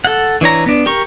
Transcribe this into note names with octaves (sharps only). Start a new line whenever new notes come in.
A4 F#5
E3 D4 C#5 A#5
B3 D4
G4 A#4 C#6